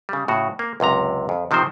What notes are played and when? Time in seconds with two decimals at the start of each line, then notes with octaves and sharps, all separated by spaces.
0.09 C#3 G3
0.28 A2 C#3 F#4
0.59 A#3
0.80 C#2 F#2 C3 A#5
1.29 F2
1.51 C3 D#3 F3 C4 C5